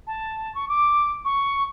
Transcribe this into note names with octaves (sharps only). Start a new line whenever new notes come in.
A5
C#6
D6
C#6